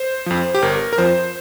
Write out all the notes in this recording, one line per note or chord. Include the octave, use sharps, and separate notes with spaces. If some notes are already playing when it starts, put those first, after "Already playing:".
Already playing: C5
F2 F3
G4
G1 A#4
A#4
F2 F3 C5